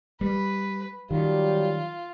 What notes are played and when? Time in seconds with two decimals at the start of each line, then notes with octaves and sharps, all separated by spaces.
0.21 G3 B4
1.11 D#3 F#3 G3 F4